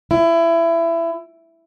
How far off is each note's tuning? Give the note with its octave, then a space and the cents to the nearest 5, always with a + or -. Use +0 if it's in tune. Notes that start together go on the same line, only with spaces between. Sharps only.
E4 +20